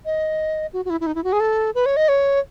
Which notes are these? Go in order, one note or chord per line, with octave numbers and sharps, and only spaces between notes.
D#5
F#4
F#4
E4
E4
D#4
E4
F#4
G#4
A4
B4
C#5
D#5
C#5